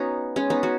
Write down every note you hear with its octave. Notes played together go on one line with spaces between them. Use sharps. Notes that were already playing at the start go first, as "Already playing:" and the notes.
Already playing: B3 C#4 D#4 F#4
G#3 C#4
B3 D#4
C#4 F#4